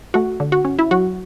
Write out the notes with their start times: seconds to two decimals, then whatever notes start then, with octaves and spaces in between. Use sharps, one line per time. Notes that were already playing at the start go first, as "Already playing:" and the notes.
0.14 A3 F#4
0.40 D3
0.52 F#4
0.65 C#4
0.79 E4
0.91 F#3 F#4